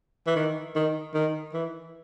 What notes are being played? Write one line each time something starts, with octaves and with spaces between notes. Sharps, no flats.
E3
D#3
D#3
D#3
E3